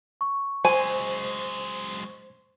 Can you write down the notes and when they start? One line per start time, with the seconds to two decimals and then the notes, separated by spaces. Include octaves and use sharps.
0.21 C#6
0.65 F#3 G#3 C5 G#5